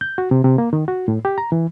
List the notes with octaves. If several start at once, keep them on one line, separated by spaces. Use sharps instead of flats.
G6
F#4
C3
C3
A#3
D#3
F#4
A2
G4
A#5
E3